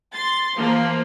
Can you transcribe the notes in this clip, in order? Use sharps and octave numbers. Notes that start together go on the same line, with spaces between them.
C6 A6
E3 F3 A#3